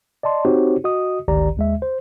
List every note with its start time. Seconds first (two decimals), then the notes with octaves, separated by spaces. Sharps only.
0.23 D5 D#5 A5 C6
0.45 C4 D#4 F#4 G4 C5 C#5
0.84 F#4 D#5 D#6
1.28 G#1 D2 D#3 G4 D5 A#5
1.57 D#2 G#3 E5
1.82 C5